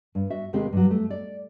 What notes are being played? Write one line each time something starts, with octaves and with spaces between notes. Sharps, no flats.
G2
F#4 E5
D#2 C3 G#3 C4 G4 B4
G2 F#3
A3
D5